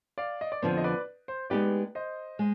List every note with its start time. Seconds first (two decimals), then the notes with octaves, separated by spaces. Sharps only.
0.18 D5 F5
0.41 D#5
0.52 D5
0.62 F2 D3 F3 B3 C5
0.77 D#5
0.84 B4 D5
1.28 C5
1.50 G#3 B3 D#4 G4 B4 D5
1.95 C5 D#5
2.39 G#3